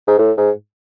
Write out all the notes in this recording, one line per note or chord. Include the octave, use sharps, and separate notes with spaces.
G#2
A2
G#2